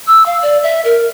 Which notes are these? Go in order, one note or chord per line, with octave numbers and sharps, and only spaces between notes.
E6
F5
D5
E5
A#4